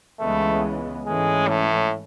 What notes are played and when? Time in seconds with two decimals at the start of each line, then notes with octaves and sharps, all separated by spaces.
0.19 C#2 C#3 E3 G#3 A3 B3
1.06 G#2 E3 G#3 A3 C#4
1.48 A2